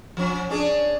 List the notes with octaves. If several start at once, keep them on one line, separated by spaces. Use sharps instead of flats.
F3 C#4
C#4 D4 G#4